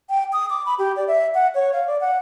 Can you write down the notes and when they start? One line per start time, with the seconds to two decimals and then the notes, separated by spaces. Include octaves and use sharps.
0.10 G5
0.33 D#6
0.50 D6
0.66 B5
0.79 G4
0.96 D5
1.08 E5
1.34 F#5
1.54 C#5
1.73 F5
1.87 D5
2.01 F#5